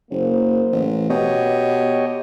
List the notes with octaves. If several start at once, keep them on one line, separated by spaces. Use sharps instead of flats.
F#1 A#3 C5
A1
B2 B3 G4 C#5 D#5